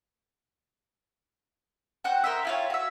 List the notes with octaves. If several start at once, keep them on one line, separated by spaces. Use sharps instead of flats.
F#4 C5 F#5 G5
A#4 C5 D#5 E5
E4 F4 C#5
F#4 E5